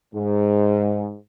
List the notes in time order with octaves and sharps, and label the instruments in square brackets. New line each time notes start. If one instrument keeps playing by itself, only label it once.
[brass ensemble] G#2